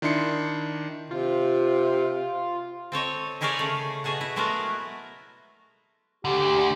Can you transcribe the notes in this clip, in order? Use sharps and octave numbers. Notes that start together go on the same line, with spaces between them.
D#3 D4 E4 C6 C7 C#7
C3 F4
C4 A4 C#5 D#5
D#4 E4 G#4 A#4 C#5 D5
C#3 A3
B2 F#4 G#4 A4 F#5
E4
F#3 G#3 A3 B3 F#4 A#4
D2 D3 G4